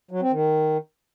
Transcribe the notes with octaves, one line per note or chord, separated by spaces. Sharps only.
F#3
C4
D#3